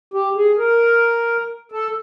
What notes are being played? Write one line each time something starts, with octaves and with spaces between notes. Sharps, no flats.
G4
G#4
A#4
A4